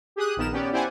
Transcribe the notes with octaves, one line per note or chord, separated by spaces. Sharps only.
G4 G#4 D#6 F#6
A#1 D#3 B3 A#4 E7
B3 C#4 G4 D5
E4 G4 C5 D5 F#5 G#5